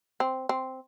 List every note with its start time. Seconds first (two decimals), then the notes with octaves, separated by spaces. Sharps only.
0.20 C4
0.49 C4